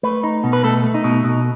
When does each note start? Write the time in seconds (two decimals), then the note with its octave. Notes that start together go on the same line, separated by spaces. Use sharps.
0.03 A3 B4
0.24 D#4
0.44 B2
0.53 B4
0.64 A3 A4
0.84 A3
0.94 D#4
1.04 B2
1.24 B2